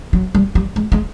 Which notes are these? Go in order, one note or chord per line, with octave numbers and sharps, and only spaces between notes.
F#3
G3
G3
G#3
G#3